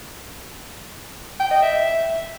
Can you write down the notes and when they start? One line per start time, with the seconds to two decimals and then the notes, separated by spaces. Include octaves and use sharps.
1.40 G5
1.51 D#5
1.62 E5